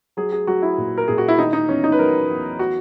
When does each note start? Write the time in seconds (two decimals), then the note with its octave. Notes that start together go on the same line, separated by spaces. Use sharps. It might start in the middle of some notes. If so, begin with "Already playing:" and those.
0.17 F#3 G#4
0.32 G#4
0.47 F#3 F#4
0.62 E4
0.78 A#2
0.98 A#4
1.08 A#2 G#4
1.18 F#4
1.28 E4
1.38 D#3 D#4
1.53 D#4
1.68 E2 C#4
1.84 D#4
1.92 B4
1.99 F#3 A#4
2.29 E2
2.59 F#4